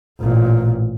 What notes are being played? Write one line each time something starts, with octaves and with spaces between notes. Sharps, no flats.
A1 A#2